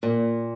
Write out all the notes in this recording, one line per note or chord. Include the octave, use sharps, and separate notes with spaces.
A#2